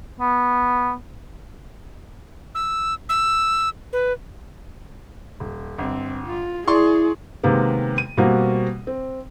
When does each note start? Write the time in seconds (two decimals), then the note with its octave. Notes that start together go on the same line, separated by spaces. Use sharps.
0.20 B3
2.55 E6
3.09 E6
3.93 B4
5.40 D#1
5.78 G1 C4
6.27 F4
6.68 E4 G#4 D5 C6 C#6
7.43 C3 D#3 G#3 A#3 B3
7.98 D#7
8.17 B2 G3 A#3 C4 F#4
8.87 C4